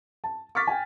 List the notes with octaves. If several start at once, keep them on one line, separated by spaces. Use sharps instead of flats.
A5
C#6 D6 F6 A6 B6
G5 G#5